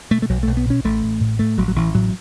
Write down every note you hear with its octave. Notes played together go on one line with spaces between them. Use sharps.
B2 A3
A3
B1 F#3
B1 A3
B3
B2 C#4
A1 A3
A1
A2
A2 A3
A1 F#3
F#3
A1 E3
A2 F#3